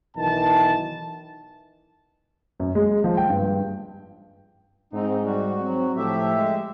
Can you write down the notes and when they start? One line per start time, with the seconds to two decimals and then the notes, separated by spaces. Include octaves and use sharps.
0.16 B1 D#3 E3 A5
2.60 F#2
2.75 G#3
3.04 F3
3.17 G5
3.30 G2
4.93 G#2 C4 D#4
5.24 G3 F#4
5.60 F#3 C4
5.97 A2 F3 G4 E5
6.36 G#3